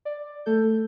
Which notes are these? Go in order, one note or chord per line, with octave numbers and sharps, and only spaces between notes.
D5
A3 A4 G6